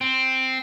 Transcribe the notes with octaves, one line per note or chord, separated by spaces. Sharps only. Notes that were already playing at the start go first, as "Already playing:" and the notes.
C4